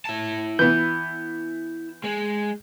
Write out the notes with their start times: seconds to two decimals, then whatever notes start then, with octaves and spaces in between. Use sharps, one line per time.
0.05 E4 A5
0.59 E3 B3 G6
2.04 G#3